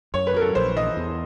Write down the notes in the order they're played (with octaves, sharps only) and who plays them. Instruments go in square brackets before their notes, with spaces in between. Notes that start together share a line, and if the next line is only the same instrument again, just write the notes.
[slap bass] F#2 [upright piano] C#5
[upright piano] B4
[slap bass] F#3 [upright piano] A#4
[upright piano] A4
[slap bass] A#1 [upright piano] C5
[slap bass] E3 [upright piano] D#5
[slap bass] E2